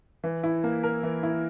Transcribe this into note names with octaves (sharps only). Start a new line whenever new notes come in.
E3
E4
A#3
A#4
E3
E4